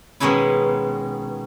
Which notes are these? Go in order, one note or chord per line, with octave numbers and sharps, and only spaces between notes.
B2 D#3 G#3 C#4 D#4 E4